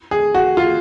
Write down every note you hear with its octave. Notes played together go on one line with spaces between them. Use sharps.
G#4
F#4
F4